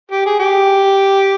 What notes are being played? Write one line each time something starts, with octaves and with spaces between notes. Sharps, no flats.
G4
G#4
G4